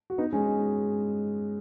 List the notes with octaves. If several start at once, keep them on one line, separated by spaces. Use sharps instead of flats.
F#4
B3 D#4
G#3 C#4